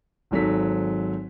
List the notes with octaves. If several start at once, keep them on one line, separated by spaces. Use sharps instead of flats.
G#1 G#2 F#3 A4 B6